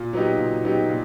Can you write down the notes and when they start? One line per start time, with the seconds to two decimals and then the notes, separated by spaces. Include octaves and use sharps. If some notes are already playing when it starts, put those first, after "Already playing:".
Already playing: A#2
0.13 F#3 B3 D#4 G4
0.38 A#2
0.64 F#3 B3 D#4 G4
0.89 A#2